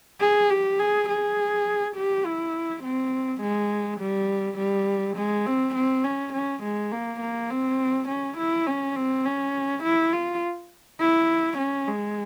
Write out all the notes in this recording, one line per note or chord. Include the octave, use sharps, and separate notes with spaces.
G#4
G4
G#4
G#4
G4
E4
C4
G#3
G3
G3
G#3
C4
C4
C#4
C#4
G#3
A#3
A#3
C4
C#4
E4
C#4
C4
C#4
E4
F4
E4
C#4
G#3